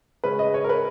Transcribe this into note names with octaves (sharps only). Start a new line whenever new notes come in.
C#3 G#3 C#4 B4
D#5
C#5
A#4
B4